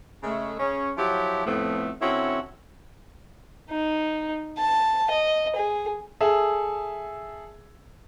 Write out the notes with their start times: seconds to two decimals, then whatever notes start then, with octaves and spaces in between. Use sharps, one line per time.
0.23 C#3 G#3 A3
0.59 C#3 C#4
0.97 F3 F#3 E4 G4
1.46 F2 A2 F3 A3 B3
2.01 D3 C4 C#4 E4 F#4
3.70 D#4
4.58 A5
5.10 D#5
5.55 G#4
6.21 G#4 A4 E5